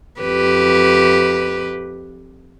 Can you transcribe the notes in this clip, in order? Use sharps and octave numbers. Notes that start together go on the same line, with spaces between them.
F2 G4 B4